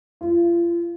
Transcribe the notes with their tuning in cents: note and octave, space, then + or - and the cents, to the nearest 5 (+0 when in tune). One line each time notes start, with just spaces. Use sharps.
F4 -35